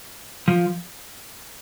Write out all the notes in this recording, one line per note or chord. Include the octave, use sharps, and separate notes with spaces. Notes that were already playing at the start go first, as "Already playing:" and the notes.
F3